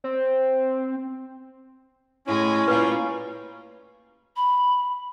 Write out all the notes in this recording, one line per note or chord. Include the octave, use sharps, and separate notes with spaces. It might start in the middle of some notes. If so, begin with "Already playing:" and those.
C4
A2 G#3 C#4 E4
A#2 G3 F4 B4
B5